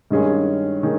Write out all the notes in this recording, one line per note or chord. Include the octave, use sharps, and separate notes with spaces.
G2 D#3 G#3 C#4 G#4
D#3 G#4